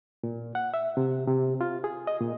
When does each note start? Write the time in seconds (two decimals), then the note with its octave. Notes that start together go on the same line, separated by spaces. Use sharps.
0.23 A#2
0.55 F#5
0.74 E5
0.97 C3
1.27 C3
1.61 F4
1.84 G#4
2.07 D#5
2.21 A#2